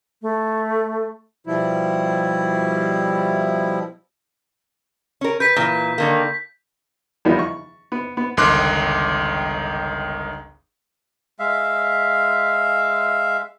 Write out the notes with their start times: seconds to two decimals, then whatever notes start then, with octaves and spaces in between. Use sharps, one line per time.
0.22 A3
1.47 B2 F3 G3 E4
5.21 C#4 A#4
5.40 B4 G6 B6
5.56 A#2 E3
5.98 D3 D#3 A#3
7.25 E2 D#3 F3 G3 B3 E4
7.39 C#6
7.92 B3
8.17 B3
8.37 G1 C#2 D#3 C6 D6 F#6
11.39 G#3 E5 F5